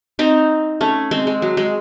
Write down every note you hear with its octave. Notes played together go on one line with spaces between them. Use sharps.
C4 D#4
A3 C#4
G#3 C4
G#3
F#3
G#3